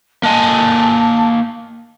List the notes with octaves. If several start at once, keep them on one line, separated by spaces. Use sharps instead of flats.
A#3 D#5 G#5 A5